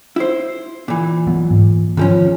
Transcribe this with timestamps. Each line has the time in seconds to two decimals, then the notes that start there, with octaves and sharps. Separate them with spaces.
0.16 E4 C5
0.88 A#2 E3
1.27 F#3 B3
1.51 G#2
1.97 E2 D#3 F3 C#4